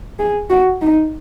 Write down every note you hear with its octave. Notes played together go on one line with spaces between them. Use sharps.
G#4
F#4
D#4